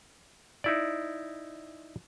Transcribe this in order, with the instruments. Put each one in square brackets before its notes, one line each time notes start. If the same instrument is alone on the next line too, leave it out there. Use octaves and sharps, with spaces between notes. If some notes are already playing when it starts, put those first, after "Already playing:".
[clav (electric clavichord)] D#4 E4 D5